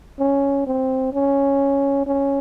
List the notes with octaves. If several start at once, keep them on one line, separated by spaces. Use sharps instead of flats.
C#4
C4
C#4
C#4